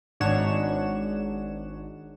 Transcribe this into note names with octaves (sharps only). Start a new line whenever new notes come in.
G#1 G#2 D4 C#5 F#5 E7